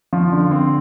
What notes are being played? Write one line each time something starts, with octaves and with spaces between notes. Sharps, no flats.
F3
D3
C4